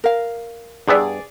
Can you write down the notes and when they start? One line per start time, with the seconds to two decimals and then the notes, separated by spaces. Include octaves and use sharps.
0.04 A#4 F5
0.88 G2 B3 G#4 D5 E5